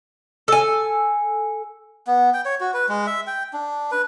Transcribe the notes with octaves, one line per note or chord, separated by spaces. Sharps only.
A4 G#5
B3
G5
C#5
F#4
B4
G#3
E5
G5
D4
B4